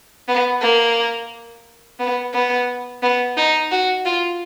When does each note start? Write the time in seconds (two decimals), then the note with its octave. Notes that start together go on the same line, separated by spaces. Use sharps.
0.28 B3
0.62 A#3
2.00 B3
2.34 B3
3.02 B3
3.37 D#4
3.71 F#4
4.05 F4